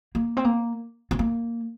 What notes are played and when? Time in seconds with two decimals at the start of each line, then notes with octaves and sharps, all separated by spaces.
0.15 A#3
0.37 C4
0.45 A#3
1.11 C4
1.19 A#3